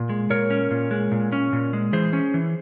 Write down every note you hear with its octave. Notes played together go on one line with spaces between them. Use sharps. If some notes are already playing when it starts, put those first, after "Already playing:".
Already playing: A#2
G#3
A#2 A#4 C#5
C#4
A#2
G#3
A#2
C#4
A#2
G#3
E3 G#4 C5
C#4
E3